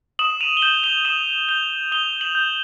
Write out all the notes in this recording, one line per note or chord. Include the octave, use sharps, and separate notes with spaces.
D#6 E7 F#7
D#7 F7
G7
G6 E7 F#7
F7 G7
D#6 E7 F#7
G6 F7 G7
D#6 F7 G7
E7 F#7
G6